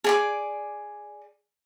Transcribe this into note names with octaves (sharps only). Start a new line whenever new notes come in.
G#4 D5 D6